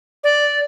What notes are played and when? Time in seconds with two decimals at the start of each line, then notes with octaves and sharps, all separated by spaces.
0.24 D5